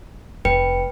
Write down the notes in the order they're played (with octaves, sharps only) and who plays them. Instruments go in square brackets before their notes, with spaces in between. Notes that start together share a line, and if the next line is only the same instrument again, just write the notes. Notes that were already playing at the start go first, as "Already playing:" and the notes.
[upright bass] F1 [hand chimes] B4 G5 C#7